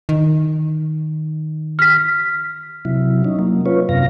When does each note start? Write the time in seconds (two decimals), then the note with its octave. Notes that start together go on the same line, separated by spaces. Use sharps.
0.09 D#3
1.79 F6 B6
2.85 C3 F#3 E4
3.24 C#4 D#4
3.39 F#3 A#3
3.66 C#4 F4 B4 C#5
3.89 F#2 C3 F5 A#6